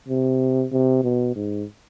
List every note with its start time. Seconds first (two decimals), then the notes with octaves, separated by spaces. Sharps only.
0.08 C3
0.72 C3
1.04 B2
1.36 G#2